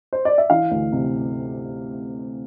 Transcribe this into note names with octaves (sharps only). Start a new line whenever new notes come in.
C5
D5
E5
E3 F5
D2
C3